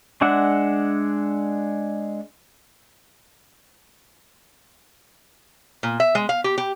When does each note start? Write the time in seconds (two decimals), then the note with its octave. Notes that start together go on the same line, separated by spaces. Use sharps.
0.21 G#3 D4 E5 F#5
5.83 A#2
6.00 E5
6.15 G#3
6.29 F5
6.44 G4
6.58 G4